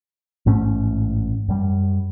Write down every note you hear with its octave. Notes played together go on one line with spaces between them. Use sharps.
A1 G#2 A3 C#4
F#2 G3